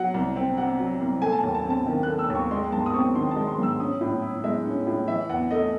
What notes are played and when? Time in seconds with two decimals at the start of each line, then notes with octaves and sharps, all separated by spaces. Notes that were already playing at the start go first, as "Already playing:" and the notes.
Already playing: F#3 F#5
0.14 C2
0.36 C4
0.58 C3 F#5
0.79 F#3
1.01 C2
1.22 A3 G#5
1.32 A5
1.38 G#5
1.43 D#2
1.54 A5
1.65 C4 A5
1.87 D#3
2.03 A3 F#6
2.19 E6
2.30 D#2
2.35 C#6
2.51 G#3 C6
2.72 G#2 A5
2.86 D#6
2.94 C4 C#6
3.15 D#3 C6
3.31 G#3 A5
3.47 C6
3.58 G#2 E6
3.80 C#4 D#6
4.01 A2
4.22 E4
4.44 G#3 E5
4.66 C#4
4.87 A2
5.08 E3 E5
5.29 E2 F#5
5.51 A3 D#5